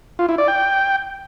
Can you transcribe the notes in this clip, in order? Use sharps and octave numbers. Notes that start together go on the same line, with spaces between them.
F4
E4
D5
G5